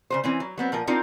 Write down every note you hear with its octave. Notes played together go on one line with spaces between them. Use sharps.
C#3 F#3 C5
E3 C4 C#4
F#3
F#3 B3 C4
A#2 F3 A#4
C4 D4 D#4 F4 A#4